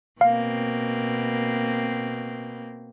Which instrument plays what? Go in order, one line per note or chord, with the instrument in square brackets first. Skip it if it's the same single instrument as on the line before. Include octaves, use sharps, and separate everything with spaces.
[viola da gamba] B2 A#3 C4 [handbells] F5